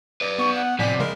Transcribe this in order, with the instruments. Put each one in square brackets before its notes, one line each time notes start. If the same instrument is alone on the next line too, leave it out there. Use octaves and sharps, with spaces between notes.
[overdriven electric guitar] B4 D5
[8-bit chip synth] B3 [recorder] C#6
[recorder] F#5
[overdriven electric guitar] F2 C3 [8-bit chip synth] A2 G#5 B6 [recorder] D5
[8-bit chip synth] C#3 G#3 A#4